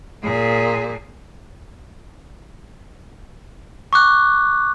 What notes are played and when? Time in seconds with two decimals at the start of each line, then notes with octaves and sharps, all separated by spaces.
0.23 A#2 G#4
3.93 C#6 D6 F#6